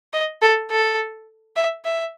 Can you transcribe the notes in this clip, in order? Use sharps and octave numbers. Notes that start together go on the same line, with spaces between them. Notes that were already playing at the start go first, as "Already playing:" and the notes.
D#5
A4
A4
E5
E5